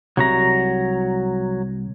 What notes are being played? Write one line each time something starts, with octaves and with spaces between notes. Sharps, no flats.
C2 F#3 F#4 A#5